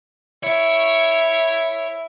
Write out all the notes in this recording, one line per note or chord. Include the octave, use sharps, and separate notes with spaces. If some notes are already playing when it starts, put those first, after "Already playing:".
E4 C#5